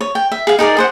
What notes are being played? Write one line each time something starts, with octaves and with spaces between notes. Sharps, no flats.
C#5
G5
E5
G#4 F5
D#4 G#4 A#4 D5
G#4 C5 F#5